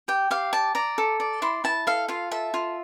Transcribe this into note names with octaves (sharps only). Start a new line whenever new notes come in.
G4 G5
G4 F5
D5 A5
D5 A#5
A4
D5
E4 C6
E4 A5
A4 F5
F4 F5
A4 E5
F4